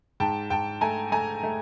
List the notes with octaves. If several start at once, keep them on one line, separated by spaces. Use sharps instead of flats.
G#2 G5 A5
G#2 G5 A5
A3 G#5 A#5
A3 G#5 A#5
A3